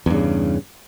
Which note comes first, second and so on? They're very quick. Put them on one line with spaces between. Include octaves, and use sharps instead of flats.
E2 G2 C#3